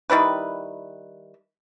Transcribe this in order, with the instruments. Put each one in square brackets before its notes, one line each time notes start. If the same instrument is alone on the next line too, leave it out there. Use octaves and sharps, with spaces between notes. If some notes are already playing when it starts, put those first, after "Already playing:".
[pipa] D#3 G3 E4 B4